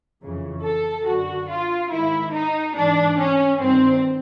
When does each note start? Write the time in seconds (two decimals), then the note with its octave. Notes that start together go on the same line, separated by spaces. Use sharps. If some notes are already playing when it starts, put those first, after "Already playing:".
0.22 F2 C#3 E3
0.63 A4
1.05 F#2 D3 F#4
1.49 F4
1.91 G#2 D#3 E4
2.33 D#4
2.75 G#2 E3 D4
3.18 C#4
3.60 G2 D#3 C4